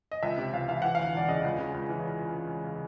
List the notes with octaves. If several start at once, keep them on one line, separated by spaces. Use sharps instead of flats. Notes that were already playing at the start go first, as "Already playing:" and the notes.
D#5
C#2 E5
C3
C#2 F5
E3 F5
E3 F#5
D2 F5
E1 D5
C#3 D#5
C#2
C#3
C#2
E3